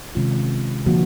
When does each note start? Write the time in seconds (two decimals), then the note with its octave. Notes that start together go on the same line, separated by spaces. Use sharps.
0.15 C3 D#3 G#3 C#4 F4
0.86 D3 F3 A#3 D4 F#4